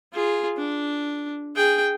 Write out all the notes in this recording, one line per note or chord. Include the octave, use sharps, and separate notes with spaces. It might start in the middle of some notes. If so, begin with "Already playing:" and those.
F4 G#4
D4
G#4 G5